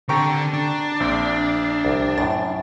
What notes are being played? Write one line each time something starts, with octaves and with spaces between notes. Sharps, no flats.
D3 C4 G4 A4 A#4 G5 A#5 C#6
D4
A#1 C4 D6
C2
F#2 A2 A6